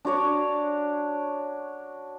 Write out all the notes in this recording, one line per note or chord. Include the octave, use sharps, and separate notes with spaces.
D4 F#4 C#5 D5